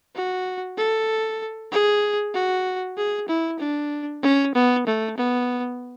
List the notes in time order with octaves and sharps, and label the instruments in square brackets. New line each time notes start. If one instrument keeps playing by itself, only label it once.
[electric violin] F#4
A4
G#4
F#4
G#4
E4
D4
C#4
B3
A3
B3